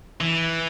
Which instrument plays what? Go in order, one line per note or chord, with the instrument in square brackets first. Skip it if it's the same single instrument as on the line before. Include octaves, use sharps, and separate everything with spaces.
[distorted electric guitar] E3